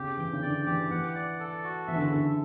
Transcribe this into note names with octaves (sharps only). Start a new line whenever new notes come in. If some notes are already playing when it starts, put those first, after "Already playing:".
Already playing: C#3 G4
E3 G5
C#3
D3 D5
E3 G4
E3 F#5
D5
A4
F#4
E3 E5
D3
C#3
D3 A4